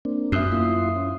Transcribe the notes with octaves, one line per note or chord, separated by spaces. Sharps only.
A#3 C4 D4
F#2 E5 D#6 C7
A#3 E4 F4 C6 D#6
C#4